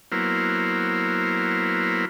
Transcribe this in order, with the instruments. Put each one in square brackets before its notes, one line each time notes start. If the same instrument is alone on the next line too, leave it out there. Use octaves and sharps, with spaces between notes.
[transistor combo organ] F#3 A#3 B3 E4 A#4 C5